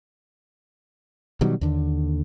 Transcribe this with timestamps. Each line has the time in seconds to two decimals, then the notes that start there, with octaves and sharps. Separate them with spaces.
1.41 B2 D#3 F#3 G3
1.61 D#2 D3